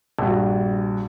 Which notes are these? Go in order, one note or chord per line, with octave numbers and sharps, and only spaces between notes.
A#1 G2 F#4